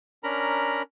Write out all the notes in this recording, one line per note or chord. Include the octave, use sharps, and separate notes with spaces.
C#4 D4 A#4 A#5 B5